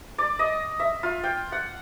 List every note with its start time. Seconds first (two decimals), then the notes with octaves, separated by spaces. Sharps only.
0.18 D5
0.39 D#5
0.80 E5
1.03 F4
1.24 G5
1.52 F#5